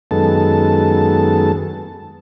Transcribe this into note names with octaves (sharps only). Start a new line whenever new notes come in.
F#2 D#3 G#3 B3 A4 A5